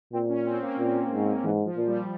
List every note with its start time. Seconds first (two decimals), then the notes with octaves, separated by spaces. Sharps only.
0.13 A#2 C4
0.29 C#4
0.45 C4
0.62 A#3
0.79 A#2
1.11 G#2
1.43 G#2 E3
1.66 F3
1.77 A#2
1.87 G3